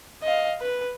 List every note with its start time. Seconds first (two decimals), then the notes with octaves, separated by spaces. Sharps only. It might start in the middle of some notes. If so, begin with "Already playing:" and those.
0.23 D#5 F5
0.61 B4